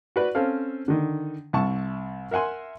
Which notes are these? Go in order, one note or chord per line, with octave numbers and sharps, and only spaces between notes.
F#4 B4 D5
C4 C#4 A4 C5 F5
D3 D#3
C2 E5 A5 C#6
A#4 E5 F#5 G#5 C6